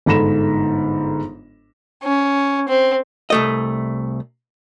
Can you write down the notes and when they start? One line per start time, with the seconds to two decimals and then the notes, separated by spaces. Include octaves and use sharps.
0.06 G1 G#2 A4 B5 A#6 E7
2.03 C#4
2.69 C4
3.30 C2 A3 D#5